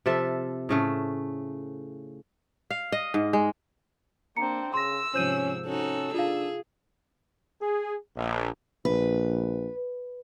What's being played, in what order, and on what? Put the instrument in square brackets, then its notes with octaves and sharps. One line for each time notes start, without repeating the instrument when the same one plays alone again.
[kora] C3 F3 A4 E5
A2 C#3 A3
F5
D#5
G#2
G#3
[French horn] A#3 [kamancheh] C4 D4 [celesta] A#5 C#7
[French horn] C#3 [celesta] C6 A#6 [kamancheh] E6
[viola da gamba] G#2 C3 F3 [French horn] C#4 [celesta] C5 G6 D#7
[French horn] C#4 [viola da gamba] D#4 F#4 [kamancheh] A4 E6
[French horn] D4 [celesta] F4 F5 [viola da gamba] G#4
[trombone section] G#4
A#1
[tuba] A#1 [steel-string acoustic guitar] B4